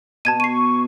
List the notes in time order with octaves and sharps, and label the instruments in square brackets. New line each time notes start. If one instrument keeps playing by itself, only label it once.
[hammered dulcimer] B2 [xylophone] A5 G#6 D#7
[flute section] C#6 [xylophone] C7 D#7